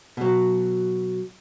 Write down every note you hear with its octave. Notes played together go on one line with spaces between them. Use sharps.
B2 F#3